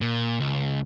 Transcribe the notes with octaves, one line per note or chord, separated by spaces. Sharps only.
A#2
C#2